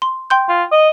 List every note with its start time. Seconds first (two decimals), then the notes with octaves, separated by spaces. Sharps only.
0.02 C6
0.30 G5 C6 G6
0.49 F4
0.72 D#5